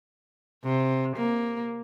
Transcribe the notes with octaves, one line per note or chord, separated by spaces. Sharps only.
C3
A#3